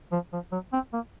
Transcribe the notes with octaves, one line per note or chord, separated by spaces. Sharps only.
F3
F3
F#3
C4
A#3